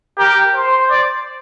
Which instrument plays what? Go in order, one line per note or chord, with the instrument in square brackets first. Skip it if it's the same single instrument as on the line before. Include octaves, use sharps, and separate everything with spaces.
[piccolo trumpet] G4 [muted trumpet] A#4
[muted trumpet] C5
[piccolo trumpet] D5